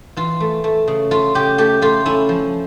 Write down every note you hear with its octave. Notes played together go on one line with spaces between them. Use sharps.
E3 F4
A3
A3
C#3
A3 F4
C#3 G4
A3 G4
A3 F4
C#4 E4
F3